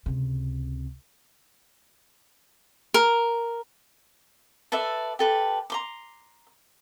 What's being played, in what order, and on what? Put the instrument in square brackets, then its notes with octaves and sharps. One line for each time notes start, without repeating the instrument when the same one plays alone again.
[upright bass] C#2 C3
[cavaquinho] A#4
A4 B4 D5 E5
G4 A4 B4
A#5 C6 D6